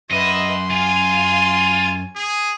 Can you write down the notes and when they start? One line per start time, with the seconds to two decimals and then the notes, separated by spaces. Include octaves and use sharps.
0.11 F#2 B4 D#5 E5 C6
0.70 F4 G#5
2.16 G#4